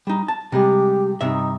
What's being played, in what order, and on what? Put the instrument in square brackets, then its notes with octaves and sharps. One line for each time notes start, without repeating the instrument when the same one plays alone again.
[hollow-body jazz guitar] G3 D#4
A5
[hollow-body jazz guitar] C3 G3 G#3 [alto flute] G4
[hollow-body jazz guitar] G2 C3 E5 [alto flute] D#4